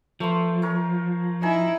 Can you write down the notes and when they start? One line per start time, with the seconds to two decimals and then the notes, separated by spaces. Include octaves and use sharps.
0.20 F3 A3 B4 C6
0.62 A#4 C#5
1.42 D#4 E4 G#5 A#5